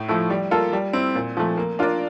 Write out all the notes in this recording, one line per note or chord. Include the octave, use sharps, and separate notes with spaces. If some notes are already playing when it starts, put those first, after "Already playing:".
Already playing: A2
F3 A3 E4
G3
A#3 F4 A4
G3
C4 E4
A#2
F3 A3
A#3
D4 F4 A#4 D5